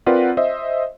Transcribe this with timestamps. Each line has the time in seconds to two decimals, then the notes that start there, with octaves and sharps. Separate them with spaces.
0.06 C4 F4 A#4 B4 D5 F#5
0.37 C5 D#5 E5